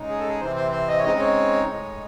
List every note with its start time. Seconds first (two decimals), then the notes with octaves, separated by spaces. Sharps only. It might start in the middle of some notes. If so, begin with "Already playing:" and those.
Already playing: C#3 G#3 D#4
0.09 G#4
0.19 A4
0.29 G#4
0.40 C3 E3 C4 C5
0.56 C5
0.72 C5
0.88 D#5
0.99 C#5
1.04 C#3 G#3 C4 D#4 D#5
1.19 C#5
1.67 A2 G#3 D#4